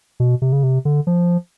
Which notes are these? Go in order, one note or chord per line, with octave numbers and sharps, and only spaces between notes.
B2
C3
C#3
C3
D3
F3